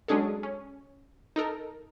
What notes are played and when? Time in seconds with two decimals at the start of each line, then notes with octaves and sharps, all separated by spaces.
0.08 F#3 G#3 C#4 D4 G#4 A4
0.43 C#4
1.36 D#4 A4 A#4